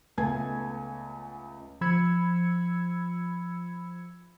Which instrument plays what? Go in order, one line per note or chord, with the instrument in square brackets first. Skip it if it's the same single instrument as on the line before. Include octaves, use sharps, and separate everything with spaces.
[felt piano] C#2 A3 B3 G#5 A5 G#6
[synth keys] F3 B5 E6 G#6 C#7